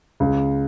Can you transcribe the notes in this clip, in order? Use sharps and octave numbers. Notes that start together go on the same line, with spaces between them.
C#2